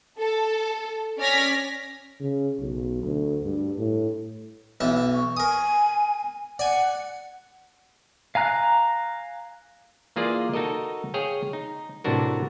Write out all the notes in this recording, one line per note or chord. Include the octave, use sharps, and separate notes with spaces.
A4
C#4 D5 F6 G#6 A#6 B6
C#3
B1
D2
G2
A2
B1 E3 A5
C#6
A#4 G#5 D#6
D5 F#5 G#5
F5 G#5 A#5 F#6
E3 A#3 F4 G#4 D5
D#4 F#4 A4 A#4 D#5
G#4 C#5 F5 G5
D#4
A2 C3 E3 D4 F#4 A#4